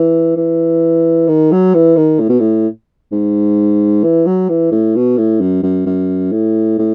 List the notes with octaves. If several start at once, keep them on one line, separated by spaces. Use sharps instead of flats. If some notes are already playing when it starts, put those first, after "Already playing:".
Already playing: E3
E3
D#3
F#3
E3
D#3
A2
B2
A2
G#2
E3
F#3
E3
A2
B2
A2
F#2
F#2
F#2
A2
A2